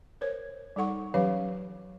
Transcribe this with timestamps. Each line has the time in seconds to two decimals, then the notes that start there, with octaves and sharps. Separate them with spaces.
0.21 A#4 C5 C#5
0.76 G3 D#4 A4 F#5 C#6
1.14 E3 F#3 C#4 G4 B4 F5